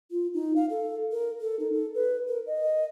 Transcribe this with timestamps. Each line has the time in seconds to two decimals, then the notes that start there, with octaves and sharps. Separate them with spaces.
0.11 F4
0.34 D#4
0.56 F5
0.70 A4
1.12 A#4
1.41 A4
1.59 D#4
1.73 A4
1.95 B4
2.28 A#4
2.47 D#5